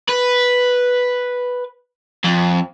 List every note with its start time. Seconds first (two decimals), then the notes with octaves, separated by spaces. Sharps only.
0.09 B4
2.25 F2